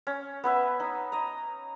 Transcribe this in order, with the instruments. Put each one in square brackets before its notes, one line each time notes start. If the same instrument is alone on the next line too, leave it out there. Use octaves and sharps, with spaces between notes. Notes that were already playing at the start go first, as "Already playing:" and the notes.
[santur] C#4
B3 B4 E5
D#4
D#5 A#5